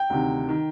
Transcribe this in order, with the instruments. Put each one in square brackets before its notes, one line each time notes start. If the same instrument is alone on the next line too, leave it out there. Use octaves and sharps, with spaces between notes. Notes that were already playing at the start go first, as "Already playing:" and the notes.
Already playing: [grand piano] G5
D2 C3 D#3
D#3